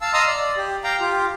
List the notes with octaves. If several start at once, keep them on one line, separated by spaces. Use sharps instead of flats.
F5 A5 E6
D#5 F5 A#5 C6 D#6 E6
D5
G4
F5 G5 A#5
F4 G4